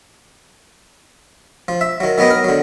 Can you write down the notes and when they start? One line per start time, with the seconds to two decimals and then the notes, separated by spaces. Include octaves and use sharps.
1.68 F3
1.81 E5
2.00 D#3 F#3
2.18 D#3 F#3 B3 D#5 G5
2.30 A#4
2.44 D3 F#3